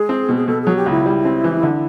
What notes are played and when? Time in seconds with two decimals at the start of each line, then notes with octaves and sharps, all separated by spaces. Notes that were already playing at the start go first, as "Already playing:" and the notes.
Already playing: G#3 G#4
0.09 C4
0.29 B2
0.36 G#4
0.48 B2 A4
0.62 F#3 G#4
0.77 G4
0.86 C#2 E4
1.06 G3
1.25 C4
1.44 E3
1.63 D3